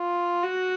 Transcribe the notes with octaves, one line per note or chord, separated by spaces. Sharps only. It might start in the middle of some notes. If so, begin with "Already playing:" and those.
Already playing: F4
F#4